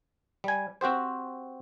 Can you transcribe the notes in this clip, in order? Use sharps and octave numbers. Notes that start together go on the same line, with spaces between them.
G3 G#5
C4 F#4 G4 C5